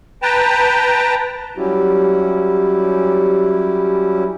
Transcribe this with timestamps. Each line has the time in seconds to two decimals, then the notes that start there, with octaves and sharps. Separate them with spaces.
0.22 B4 G5 A5 A#5
1.57 F#3 G3 C#4 E4 F#4 G4